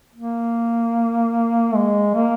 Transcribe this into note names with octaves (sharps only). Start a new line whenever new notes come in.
A#3
G#3
A#3